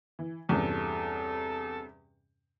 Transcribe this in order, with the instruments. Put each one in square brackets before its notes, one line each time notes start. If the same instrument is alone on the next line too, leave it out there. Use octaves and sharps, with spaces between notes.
[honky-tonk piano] E3
[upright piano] E2 [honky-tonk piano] G2 C3 C#4 [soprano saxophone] A4